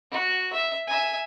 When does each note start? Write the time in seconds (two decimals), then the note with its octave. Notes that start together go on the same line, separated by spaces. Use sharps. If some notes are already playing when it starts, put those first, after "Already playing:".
0.11 F#4
0.53 E5
0.87 E5 G#5